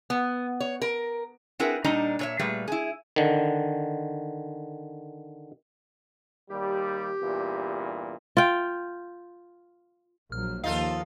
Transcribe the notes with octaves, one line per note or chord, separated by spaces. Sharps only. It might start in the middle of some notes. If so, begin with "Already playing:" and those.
B3
C#5
A#4
C4 E4 G#4 A#4 B4 F#5
A#2 G3 D4 D#4 D#5 A#5
A#2 C#5 E5
A#2 G3 A3 G#4 B4
E4 G#4
D3 D#3
D#2 G3 G4
E2 G2 A#2
F4 G5
A#1 F#3 F6
D#2 F3 D#4 F4 A4 F5